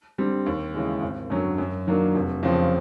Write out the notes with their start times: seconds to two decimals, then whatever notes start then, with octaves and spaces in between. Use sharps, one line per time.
0.18 D3 G3 C4
0.46 D#2
0.74 C#3 E3 G#3
1.02 G#1
1.30 F#2 D3 F#3
1.58 F#2
1.87 D#3 F#3 A#3 D4
2.15 F1
2.43 F2 C#3 F3